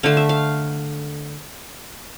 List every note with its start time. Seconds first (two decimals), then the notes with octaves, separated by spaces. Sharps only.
0.03 D3 A3 F5
0.17 E5
0.29 F5